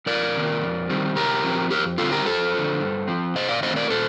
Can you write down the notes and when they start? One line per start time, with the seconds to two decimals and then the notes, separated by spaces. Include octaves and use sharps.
0.06 F2 A#4 D5
0.34 C3 D#3 A#3
0.62 F2
0.89 D#3 G3 C4
1.16 C3 G4 A#4
1.43 F3 C4
1.71 F2 G4 A#4
1.98 D3 G3 C4 F4 A4
2.12 G4 A#4
2.25 F2 A4 C5
2.53 D3 F3
2.81 G2
3.08 F3 C4
3.35 C3 C5 D#5
3.49 D5 F5
3.63 D#3 A3 C4 C5 D#5
3.76 A#4 D5
3.90 A#2 A4 C5